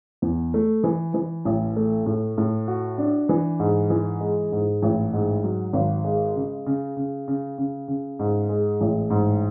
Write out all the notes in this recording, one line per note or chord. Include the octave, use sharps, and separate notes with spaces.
E2
A3
E3
E3
A1
A3
A2
A2
F#4
D4
E3
G#2
E3
G#3
G#2
A1
G#2
F#3
G#1
G#3
C#3
C#3
C#3
C#3
C#3
C#3
G#2
G#3
A1
G#2